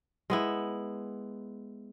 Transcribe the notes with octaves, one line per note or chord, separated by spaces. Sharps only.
G#3 B3 E4